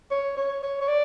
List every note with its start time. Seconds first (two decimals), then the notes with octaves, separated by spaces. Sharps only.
0.11 C#5
0.37 C#5
0.63 C#5
0.81 C#5
0.88 D5